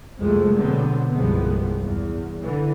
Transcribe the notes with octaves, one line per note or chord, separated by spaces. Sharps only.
C2 F2 F3 G#3 A3
B2 D3 F#3 B3 C4
C2 G2 F3 G#3 B3
E2
D3 E3